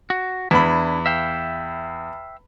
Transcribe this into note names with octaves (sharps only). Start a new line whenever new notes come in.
F#4
E2 D4 E4 B5
E5 F5 G5